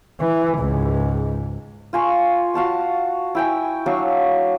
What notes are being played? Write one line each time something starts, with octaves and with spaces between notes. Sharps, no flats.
E3
C#2 G#2
F4 G#5 C#6
F#4 F5 A5 C#6
E4 G5 G#5
F#3 D4 F5 C#6